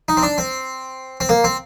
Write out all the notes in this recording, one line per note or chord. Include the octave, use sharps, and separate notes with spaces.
D#4
C4
D4
C4
C4
A#3
C4